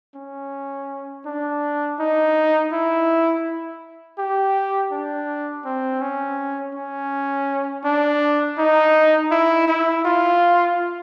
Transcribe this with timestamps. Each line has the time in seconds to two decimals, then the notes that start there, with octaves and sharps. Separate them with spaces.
0.15 C#4
1.26 D4
1.99 D#4
2.72 E4
4.18 G4
4.91 D4
5.65 C4
6.01 C#4
6.75 C#4
7.85 D4
8.58 D#4
9.31 E4
9.67 E4
10.05 F4